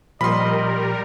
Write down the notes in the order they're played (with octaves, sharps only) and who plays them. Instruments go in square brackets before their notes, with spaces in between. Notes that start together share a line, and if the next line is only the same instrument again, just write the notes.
[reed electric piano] A#2 F3 [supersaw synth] G3 A#4 [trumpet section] D#5 [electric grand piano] B5 C6